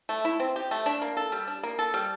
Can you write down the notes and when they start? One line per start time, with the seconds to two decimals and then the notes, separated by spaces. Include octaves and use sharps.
0.09 A3
0.25 E4
0.40 C4
0.56 G4
0.71 A3
0.86 D4
1.02 A#3
1.17 A4
1.32 G3
1.47 D4
1.63 A#3
1.79 A4
1.94 G3